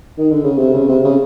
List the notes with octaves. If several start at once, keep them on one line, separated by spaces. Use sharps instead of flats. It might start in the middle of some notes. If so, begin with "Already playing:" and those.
D#3
D3
C#3
C3
C#3
C3
C#3